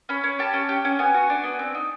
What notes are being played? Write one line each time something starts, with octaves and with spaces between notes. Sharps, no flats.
C#4 B5
C#4
G4 A5
C#4
G4
C#4
B3 G#5
F#4
D4
B3
C4
D#4